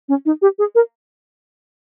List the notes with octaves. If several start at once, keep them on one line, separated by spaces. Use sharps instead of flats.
C#4
D#4
G4
G#4
A#4